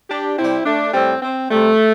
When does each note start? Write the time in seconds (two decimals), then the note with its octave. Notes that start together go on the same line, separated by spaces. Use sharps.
0.09 D4 G4
0.37 C3 G3 C4 E4
0.65 A3 D4
0.93 A2 G3 C4
1.22 C4
1.50 C3 G3 A3